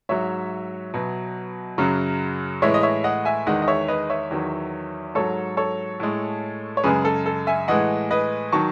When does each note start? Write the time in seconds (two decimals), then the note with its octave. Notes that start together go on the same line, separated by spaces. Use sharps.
0.09 G#2 F#3 C#5 E5
0.94 B2 F#3
1.78 F#2 C#3 F#3
2.62 A2 E3 G#3 C#5 E5
2.74 D#5
2.83 C#5 E5
3.04 D#5 F#5
3.25 E5 G#5
3.47 E2 D#3 G#3 D#5 F#5
3.62 D#5
3.68 C#5 E5
3.88 B4 D#5
4.10 C#5 E5
4.31 E2 D#3 F#3
5.15 G#2 F#3 A4 C#5
5.57 A4 C#5
6.00 A2 G#3
6.77 C#5
6.84 F#2 C#3 G#3 G#4 B4
7.05 A4
7.26 A4
7.47 E5 G#5
7.68 A2 E3 G#3 D#5 F#5
8.11 B4 D#5
8.52 D#3 F#3 A5 C#6